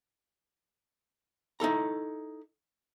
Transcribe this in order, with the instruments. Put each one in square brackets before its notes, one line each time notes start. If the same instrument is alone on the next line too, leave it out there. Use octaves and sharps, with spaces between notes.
[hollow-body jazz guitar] D#4 E4 A4 A#5